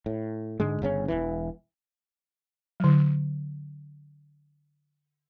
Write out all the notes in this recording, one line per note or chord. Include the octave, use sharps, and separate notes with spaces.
A2
G#2 D3 G#3
G1 C#3 C#4
E1 A#1 E3
D3 F#3